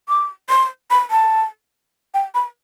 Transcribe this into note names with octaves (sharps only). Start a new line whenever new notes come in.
D6
C6
B5
A5
G5
B5